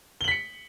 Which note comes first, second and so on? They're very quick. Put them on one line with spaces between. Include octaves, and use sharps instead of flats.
G7 F#7 B6 C#7